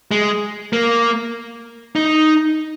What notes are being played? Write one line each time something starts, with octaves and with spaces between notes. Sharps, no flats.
G#3
A#3
D#4